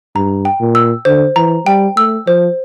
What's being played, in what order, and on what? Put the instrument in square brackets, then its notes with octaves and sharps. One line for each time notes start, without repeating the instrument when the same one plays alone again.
[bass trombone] G2 [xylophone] A#5
[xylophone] G5
[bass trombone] A#2
[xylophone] E6
[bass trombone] D3 [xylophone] C5
[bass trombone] E3 [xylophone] A#5
[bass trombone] G3 [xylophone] G5
[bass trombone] A3 [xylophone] E6
[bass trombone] F3 [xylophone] C5